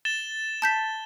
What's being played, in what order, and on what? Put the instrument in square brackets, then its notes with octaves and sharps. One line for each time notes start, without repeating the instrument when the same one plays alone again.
[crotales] A6 E7 G7
[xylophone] A5 G6 B6